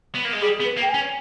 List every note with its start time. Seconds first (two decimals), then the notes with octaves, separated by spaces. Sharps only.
0.15 B3
0.25 A#3
0.33 G#3
0.42 G3 G#4
0.60 B3
0.65 B4
0.77 A#3
0.82 G5
0.89 G#5
0.94 C#4